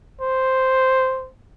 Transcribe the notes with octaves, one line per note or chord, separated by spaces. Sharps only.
C5